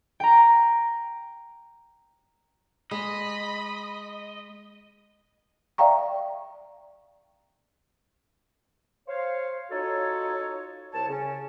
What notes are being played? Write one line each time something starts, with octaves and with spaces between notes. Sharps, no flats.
G5 A#5
G#3 D#5 B5
D5 E5 F5 G5 A#5 C#6
C5 C#5 F5
D#4 F4 F#4 A4 C#5
C2 C#5 A5
C#3 C#4